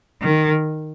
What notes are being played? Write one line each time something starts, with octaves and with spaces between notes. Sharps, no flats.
D#3